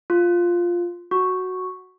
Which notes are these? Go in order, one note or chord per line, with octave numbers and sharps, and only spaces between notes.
F4
F#4